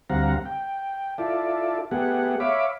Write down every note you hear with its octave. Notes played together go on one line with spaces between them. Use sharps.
D2 G3 C4 F5 F#5 A#5
G5
E4 F4 A4 D5
A3 B3 G4 G#4 F#5
C#5 E5 F5 B5 D6